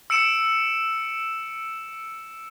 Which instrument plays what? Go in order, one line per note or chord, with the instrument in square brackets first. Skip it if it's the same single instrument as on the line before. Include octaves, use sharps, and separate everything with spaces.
[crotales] E6 C#7 D7 E7